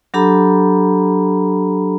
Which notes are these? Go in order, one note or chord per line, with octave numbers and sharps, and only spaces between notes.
F#3 D4 G4 A4 A#5 B5